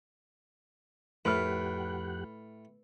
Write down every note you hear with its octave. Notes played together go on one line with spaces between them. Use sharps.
F2 A2 G4 B4 F#5 B5 F6